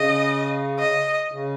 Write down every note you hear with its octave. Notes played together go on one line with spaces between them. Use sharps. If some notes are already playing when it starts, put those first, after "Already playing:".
Already playing: C#3 D#5
D#5
C#3